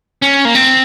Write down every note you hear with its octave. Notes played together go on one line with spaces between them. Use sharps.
C#4
A#3
C4